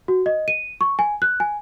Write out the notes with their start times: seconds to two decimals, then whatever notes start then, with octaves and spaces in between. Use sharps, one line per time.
0.08 F#4
0.26 D#5
0.48 D#7
0.81 C#6
0.99 G#5
1.22 F#6
1.40 G#5